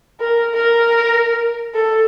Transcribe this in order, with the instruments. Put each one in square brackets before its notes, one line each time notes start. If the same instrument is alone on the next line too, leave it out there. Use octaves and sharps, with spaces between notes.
[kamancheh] A#4
A#4
A4